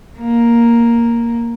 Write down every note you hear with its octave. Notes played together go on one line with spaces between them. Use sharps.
A#3